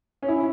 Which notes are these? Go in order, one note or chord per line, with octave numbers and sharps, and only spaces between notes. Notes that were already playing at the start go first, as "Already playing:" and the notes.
C#4
E4